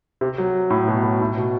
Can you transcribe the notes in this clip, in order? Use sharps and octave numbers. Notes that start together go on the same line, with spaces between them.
C3
F#3
A2
B2
B2
A2
B2